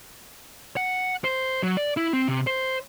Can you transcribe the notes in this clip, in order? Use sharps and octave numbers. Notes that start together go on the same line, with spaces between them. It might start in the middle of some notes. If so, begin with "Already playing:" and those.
F#5
C5
F#3
D5
E4
C4
C3
C5